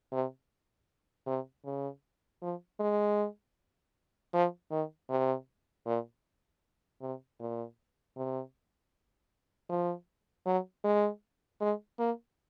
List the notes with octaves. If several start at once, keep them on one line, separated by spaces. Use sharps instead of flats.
C3
C3
C#3
F3
G#3
F3
D#3
C3
A#2
C3
A#2
C3
F3
F#3
G#3
G#3
A#3